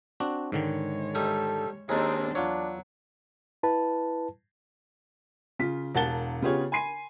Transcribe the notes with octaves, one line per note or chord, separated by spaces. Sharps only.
C4 D4 F#4
G#2 D3 D#3 G#3 C#5
G3 D#4 A4 E5
D#2 G#3 C4 D4 D#4 G#4 A4
E2 F#3 D4 F4 C#5
E4 B4 A5
C#3 F4 B6
E1 A#4 F#5 A5 A6 G7
C#3 B3 F4 G4 G#4 C#5
G#5 B5 C6 C7 D#7